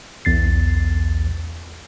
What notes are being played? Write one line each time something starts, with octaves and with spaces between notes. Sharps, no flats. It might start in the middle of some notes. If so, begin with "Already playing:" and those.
B1 E2 A6 C7